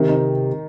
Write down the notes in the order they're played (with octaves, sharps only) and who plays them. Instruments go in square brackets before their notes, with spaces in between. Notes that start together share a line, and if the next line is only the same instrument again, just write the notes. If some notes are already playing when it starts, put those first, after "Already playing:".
Already playing: [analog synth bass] C3 [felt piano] D#3
[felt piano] D#4